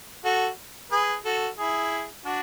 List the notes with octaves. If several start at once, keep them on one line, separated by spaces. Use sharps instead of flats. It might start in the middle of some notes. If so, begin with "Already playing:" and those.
F#4 A4
G#4 B4
F#4 A4
E4 G#4
D4 F#4